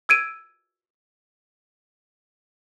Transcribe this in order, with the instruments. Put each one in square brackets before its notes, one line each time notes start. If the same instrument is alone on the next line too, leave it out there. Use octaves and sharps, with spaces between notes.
[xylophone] E6 G#6 D7 D#7